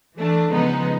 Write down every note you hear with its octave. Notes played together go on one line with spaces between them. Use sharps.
E3 A3 D4
C#3 F3 G#3 B3 D#4